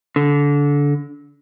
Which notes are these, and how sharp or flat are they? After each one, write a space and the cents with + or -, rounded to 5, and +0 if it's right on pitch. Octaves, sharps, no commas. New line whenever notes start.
D3 -25